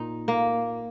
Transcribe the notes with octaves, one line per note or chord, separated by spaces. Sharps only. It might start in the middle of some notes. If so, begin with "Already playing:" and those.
Already playing: A#2 D#4
A#3